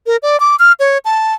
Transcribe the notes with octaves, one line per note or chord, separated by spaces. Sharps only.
A#4
D5
D6
F6
C#5
A5